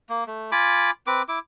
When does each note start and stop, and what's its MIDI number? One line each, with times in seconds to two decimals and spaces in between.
0.09 0.24 58
0.27 0.51 57
0.52 0.91 65
0.52 0.91 80
0.52 0.91 83
0.52 0.91 86
1.07 1.22 60
1.07 1.22 71
1.07 1.22 86
1.29 1.39 64
1.29 1.39 86